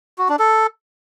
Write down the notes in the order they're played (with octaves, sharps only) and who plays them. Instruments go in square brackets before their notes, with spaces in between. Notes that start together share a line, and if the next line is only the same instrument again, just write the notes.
[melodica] F#4
D4
A4